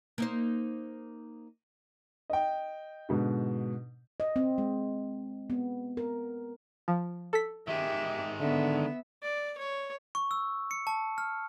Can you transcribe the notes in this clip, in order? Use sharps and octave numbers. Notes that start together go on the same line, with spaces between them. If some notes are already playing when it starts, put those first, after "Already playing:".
A#3 D#4 C5
D#5 G5
G#2 B2 D3
D#5
C4
G#3
B3
A#4
F3
A4 B6
D#3 G#3 G4 E5
D3 B3 E5
D5
C#5
C#6
E6
C#7
A5
F6